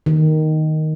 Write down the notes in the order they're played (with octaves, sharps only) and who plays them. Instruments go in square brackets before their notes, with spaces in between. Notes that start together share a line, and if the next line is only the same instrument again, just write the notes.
[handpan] D#3